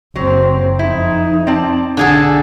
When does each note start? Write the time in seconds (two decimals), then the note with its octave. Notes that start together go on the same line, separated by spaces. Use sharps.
0.16 F#1 F#3 C4
0.79 F2 D#4 E4
1.47 C4 D5 A5
1.97 B1 D3 G#4 A4